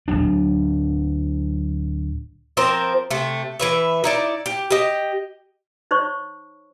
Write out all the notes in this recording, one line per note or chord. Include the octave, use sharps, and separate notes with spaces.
D1 G1 F#3 D4
F3 C4 A#4 C5
C3 A3
E3 B4 E5
D#4 E4 D5
G4
G4 D#5
D#4 C5 C#5 C#6